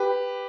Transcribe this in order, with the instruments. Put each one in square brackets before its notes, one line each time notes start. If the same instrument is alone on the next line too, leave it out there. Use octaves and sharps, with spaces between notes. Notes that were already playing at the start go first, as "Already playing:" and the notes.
Already playing: [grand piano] G4 B4